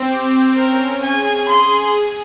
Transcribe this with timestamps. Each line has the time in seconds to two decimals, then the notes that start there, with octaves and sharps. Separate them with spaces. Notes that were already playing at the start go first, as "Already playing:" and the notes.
Already playing: C4
0.10 G4
0.56 C#4 A#4
1.02 G#4 G#5
1.49 C6